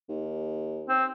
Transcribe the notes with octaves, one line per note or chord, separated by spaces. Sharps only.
D#2
C4